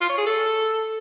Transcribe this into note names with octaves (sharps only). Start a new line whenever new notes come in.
F4
C#5
G#4
A4